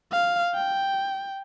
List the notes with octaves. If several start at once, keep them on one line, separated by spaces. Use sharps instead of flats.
F5
G5